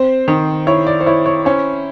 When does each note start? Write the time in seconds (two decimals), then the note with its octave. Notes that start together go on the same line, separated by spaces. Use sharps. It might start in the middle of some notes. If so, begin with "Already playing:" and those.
Already playing: C4 C5
0.28 D#3
0.67 E4 C#5
0.86 D5
1.01 C5
1.06 E4 C#5
1.26 C#5
1.45 C#4 C5